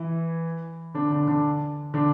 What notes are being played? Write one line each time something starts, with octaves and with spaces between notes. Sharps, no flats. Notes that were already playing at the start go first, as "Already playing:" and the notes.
Already playing: E3 E4
D3 D4
D3 D4
D3 D4
D3 D4